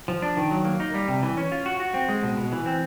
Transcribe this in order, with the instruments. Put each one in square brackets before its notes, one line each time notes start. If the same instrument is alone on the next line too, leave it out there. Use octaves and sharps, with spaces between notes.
[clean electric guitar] F3
D4
D#3
F#3
A#3
D#4
G3
C3
E3
C#4
F4
F#4
F#4
C4
G#3
B2
B2
E3
C4